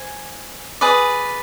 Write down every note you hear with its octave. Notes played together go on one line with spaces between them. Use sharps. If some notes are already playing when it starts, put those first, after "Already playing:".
Already playing: C5 G#5
G#4 B4 D5